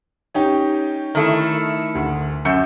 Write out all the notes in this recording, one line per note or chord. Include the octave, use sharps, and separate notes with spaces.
C#4 D#4 G4
D#3 A3 E4
D2
F#2 E6 G6 C#7